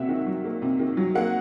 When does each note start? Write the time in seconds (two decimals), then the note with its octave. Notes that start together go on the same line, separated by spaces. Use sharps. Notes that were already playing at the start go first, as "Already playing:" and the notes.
Already playing: C3 F#3 A#3 E5 F#5
0.09 D#3
0.26 F#3
0.44 A#3
0.62 C3
0.79 D#3
0.97 F#3
1.15 A#3 F#5